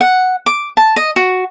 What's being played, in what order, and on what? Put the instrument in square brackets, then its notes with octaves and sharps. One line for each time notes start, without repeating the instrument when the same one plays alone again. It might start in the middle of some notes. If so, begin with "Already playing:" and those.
[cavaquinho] F#5
D6
A5
D#5
F#4